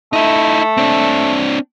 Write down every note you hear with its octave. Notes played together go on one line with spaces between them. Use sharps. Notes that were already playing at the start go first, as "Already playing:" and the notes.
A3 D#4 E4
C4 D4